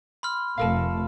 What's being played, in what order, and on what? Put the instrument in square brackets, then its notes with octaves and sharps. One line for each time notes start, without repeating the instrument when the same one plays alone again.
[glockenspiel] B5 C6 F6
[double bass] F1 A3 [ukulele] A4 A#4 F5